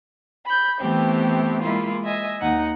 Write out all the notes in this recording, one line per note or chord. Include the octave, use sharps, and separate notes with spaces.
B5 G6
E3 A3 B3 C4 G4
G#3 A#3 E4 F4
D#5 E5 G#5
D#2 D#4 F#5